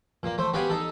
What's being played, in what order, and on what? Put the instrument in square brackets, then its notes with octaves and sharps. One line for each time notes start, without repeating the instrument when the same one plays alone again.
[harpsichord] A#2 A#3
A3 C5
B3 F#4 G4 D5 F5 G#5
D#4 A4